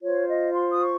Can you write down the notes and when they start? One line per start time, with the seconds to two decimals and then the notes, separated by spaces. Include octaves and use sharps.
0.02 F4 C5 C#5
0.28 D#5
0.54 C6
0.71 D#6
0.80 C#6